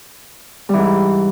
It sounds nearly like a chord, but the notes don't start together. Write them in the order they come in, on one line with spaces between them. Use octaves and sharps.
G3 E3 G#2